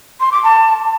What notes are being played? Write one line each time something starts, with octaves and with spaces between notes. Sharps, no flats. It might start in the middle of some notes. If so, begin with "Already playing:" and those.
C6
D6
A5